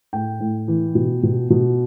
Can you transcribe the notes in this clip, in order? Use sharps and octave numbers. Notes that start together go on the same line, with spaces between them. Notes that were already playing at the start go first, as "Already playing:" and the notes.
A2 G5
A2
E3
B2
B2
B2